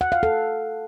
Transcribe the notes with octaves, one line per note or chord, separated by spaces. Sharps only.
F#5
F5
A4